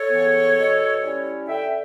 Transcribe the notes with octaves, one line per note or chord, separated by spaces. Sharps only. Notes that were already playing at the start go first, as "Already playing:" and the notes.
Already playing: A4 C#5
C#3 E3 B3
B2
G3 C#4 E4
D3 E5 G5